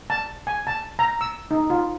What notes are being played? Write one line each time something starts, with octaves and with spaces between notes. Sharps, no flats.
A5
G#5
A5
A#5
E6
D#4
F4